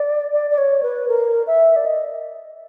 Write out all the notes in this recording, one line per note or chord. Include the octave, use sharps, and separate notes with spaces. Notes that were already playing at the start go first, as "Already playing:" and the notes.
Already playing: D5
D5
D5
C#5
B4
A#4
E5
D5
D#5